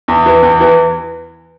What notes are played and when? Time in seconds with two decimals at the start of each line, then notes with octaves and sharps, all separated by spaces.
0.08 E2
0.26 E3
0.43 E2
0.60 E3